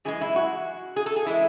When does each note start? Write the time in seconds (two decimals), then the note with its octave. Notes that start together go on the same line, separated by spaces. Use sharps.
0.05 F#2 E3 G#3 G#4
0.21 E4
0.36 F#4
0.96 G#4
1.06 A4
1.16 G#4
1.26 E3 G#3 E4